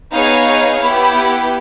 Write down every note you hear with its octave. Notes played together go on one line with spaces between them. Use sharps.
B3 D#4 G#4 C#5 F5
B3 E4 G4